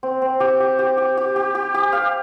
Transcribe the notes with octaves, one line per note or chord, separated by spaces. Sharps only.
C4
C4
G4
G4
G4
G4
G4
G4
G4
G4
F5